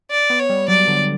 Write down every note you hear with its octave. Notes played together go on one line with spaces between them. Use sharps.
D5
B3
C#5
G3
F#3 D5
D3